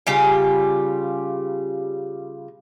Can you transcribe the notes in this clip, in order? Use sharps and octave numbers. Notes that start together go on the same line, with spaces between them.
C#3 G3 F4